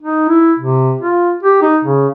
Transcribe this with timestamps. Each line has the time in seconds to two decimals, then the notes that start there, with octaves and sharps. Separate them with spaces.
0.02 D#4
0.29 E4
0.59 C3
1.01 F4
1.43 G4
1.62 D#4
1.84 C#3